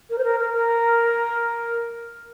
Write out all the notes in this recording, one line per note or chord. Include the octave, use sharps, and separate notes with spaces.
A#4
C5
A#4
A#4
A#4